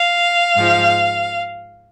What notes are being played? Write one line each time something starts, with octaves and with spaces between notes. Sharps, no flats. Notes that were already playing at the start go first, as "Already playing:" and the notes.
Already playing: F5
G#2 F3